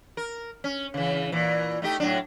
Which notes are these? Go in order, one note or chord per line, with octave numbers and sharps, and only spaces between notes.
A#4
C#4
C#3 E3
A#2 E3
A3 D#4 G4
A2 F#3 D4